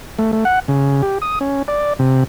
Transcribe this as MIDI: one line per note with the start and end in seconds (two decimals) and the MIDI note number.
0.19 0.32 57
0.33 0.44 57
0.45 0.59 78
0.68 1.02 49
1.02 1.18 67
1.22 1.39 87
1.41 1.62 61
1.68 1.93 74
1.99 2.24 48